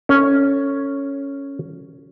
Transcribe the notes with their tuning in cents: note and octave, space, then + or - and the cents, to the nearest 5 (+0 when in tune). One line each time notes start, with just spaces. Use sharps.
C#4 +0 A4 +30